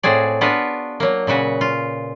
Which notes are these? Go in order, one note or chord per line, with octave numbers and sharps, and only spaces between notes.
A2 C4 F#4 G#4 D5
B3 D4 F4 F#4 B4
F#3 A#3
A#2 C#3 F#4 B4
F4